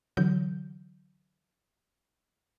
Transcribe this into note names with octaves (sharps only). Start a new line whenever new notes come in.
D3 E3 F#3 G6